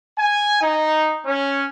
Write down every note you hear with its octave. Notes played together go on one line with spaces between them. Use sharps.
G#5
D#4
C#4